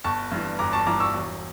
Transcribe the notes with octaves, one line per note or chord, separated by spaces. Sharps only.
G1 A5 C#6
G2 E3
G1 A#5 D6
A5 C#6
G2 E3 A#5 D6
C#6 E6
E1